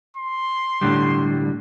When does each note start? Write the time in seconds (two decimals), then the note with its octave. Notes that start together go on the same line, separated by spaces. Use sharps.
0.17 C6
0.81 A2 D3 G3